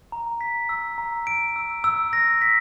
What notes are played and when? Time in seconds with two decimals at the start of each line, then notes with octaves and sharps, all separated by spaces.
0.12 A#5
0.41 B6
0.69 E6
0.98 A#5
1.27 D7
1.56 E6
1.84 E6
2.13 A#6
2.42 B6